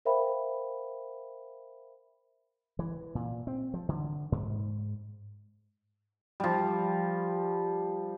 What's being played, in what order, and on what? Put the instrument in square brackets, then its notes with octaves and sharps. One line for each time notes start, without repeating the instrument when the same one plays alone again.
[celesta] A#4 C5 E5 F5 G5 B5
[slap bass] E3
A#2
C4
F3
D3
G#2
[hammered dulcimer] F3 G3